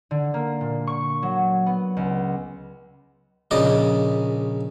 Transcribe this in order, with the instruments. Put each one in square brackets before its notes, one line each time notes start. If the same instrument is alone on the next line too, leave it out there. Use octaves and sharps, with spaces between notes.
[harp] D3
A#3
A#2
C#6
F#3
B3
C#2
[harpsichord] A#1 C#3 D5 D#5